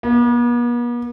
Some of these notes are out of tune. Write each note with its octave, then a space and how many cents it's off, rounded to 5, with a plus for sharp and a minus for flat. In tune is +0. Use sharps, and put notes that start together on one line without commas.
B3 -45